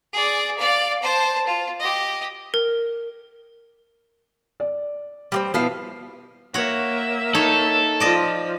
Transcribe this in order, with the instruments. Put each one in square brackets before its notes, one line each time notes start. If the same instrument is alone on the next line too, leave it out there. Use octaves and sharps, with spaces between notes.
[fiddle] G#4 D5
D5 F5
C5 A5
F4
G4 D#5
[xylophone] A#4
[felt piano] D5
[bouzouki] G3 A#3 C4
[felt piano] B2 B3 [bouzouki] F3 E4 F5
[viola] A#3 E5 [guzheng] F#4 C#5
[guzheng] D#4 C#5 [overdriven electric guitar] A4
[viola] F3 F4 [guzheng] D5 D#5 A5